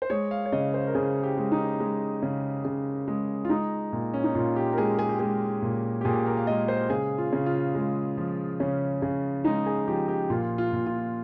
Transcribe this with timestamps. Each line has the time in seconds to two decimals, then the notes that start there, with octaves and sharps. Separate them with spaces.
0.02 C5
0.10 G#3 C#5
0.31 F5
0.45 C#5
0.52 C#3 D#5
0.74 C5
0.87 A#4
0.95 C#3 G#4
1.23 G4
1.37 G#3
1.52 D#4
1.80 G#3
2.22 C#3
2.65 C#3
3.08 G#3
3.45 F4
3.50 G#3 D#4
3.92 A#2
4.14 C#4
4.24 D#4
4.35 A#2 F4
4.56 G4
4.72 A#4
4.78 G#3 G#4
4.99 G#4
5.09 G4
5.19 G#3 G#4
5.62 A#2
6.01 G4
6.05 A#2 G#4
6.26 A#4
6.37 F5
6.47 G#3 D#5
6.68 C5
6.90 C#3 G#4
7.18 F4
7.33 C#3
7.46 F4
7.75 G#3
8.17 F3
8.60 C#3 C#4
9.02 C#3
9.44 G#3 D#4
9.66 G#4
9.88 F3 G4
10.08 G4
10.30 A#2 F4
10.58 F4
10.72 A#2
10.87 F4